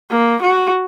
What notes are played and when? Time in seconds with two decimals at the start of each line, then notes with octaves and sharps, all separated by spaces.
0.11 A#3
0.42 F#4